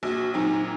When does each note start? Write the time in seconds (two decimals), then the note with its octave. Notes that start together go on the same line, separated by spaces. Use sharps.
0.03 A#1 F#4
0.34 A#2 F#3 C4 D#4